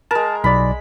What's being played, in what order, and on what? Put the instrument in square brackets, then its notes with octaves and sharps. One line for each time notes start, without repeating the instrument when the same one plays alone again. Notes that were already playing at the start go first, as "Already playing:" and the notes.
[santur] G#3 A#4 [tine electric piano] A5
[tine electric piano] B1 D5 [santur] B5